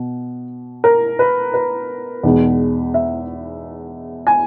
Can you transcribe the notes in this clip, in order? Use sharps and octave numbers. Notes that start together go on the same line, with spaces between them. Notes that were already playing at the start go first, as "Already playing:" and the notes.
Already playing: B2
A#4
B4
B4
E2 B2 G#3 D#4
E5
G#5